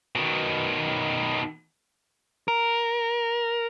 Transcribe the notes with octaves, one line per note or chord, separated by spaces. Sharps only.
B2 D#3
A#4